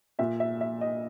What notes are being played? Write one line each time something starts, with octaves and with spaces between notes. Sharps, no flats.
A#2 E5
E5
E5
D#5